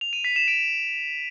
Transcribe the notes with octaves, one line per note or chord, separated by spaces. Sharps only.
F7
D#7
B6
E7
D7